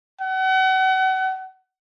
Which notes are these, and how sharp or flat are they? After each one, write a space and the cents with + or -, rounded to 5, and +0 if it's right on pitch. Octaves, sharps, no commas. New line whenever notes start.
F#5 +35